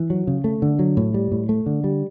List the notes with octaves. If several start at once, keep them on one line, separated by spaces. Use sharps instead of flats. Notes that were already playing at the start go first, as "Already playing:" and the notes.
Already playing: E3
F#3
C#3
A3
D3
F#3
A2
G3
A2
A3
D3
G3